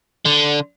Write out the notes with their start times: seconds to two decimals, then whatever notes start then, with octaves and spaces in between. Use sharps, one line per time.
0.26 D3